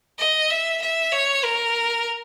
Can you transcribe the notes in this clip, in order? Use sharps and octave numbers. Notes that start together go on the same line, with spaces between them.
D#5
E5
E5
C#5
A#4